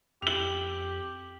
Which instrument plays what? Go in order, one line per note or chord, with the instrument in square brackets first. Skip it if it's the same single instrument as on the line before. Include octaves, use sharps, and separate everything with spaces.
[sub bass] F2 [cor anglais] G4 [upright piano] F7 F#7